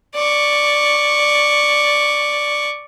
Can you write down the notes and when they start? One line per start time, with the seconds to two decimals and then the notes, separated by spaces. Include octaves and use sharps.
0.15 D5 C#6